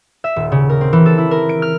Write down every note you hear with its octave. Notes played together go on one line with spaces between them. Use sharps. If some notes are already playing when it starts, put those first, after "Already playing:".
E5
D#1
C#3
A#4
C4
E3
A4
E4
A#4
D7
F6